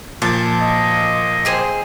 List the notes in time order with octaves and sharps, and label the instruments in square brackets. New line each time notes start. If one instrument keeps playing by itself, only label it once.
[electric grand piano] A#2 F3 A6 [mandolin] A5
[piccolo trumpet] D#5
[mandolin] C4 G#4 C5